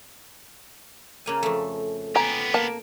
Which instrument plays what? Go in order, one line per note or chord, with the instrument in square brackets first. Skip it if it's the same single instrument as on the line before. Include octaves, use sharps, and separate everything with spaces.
[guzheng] C#3 A#3 G#5
F2 A3
[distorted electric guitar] B3 G4 [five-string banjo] G#5 A#5
[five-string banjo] A#3 A5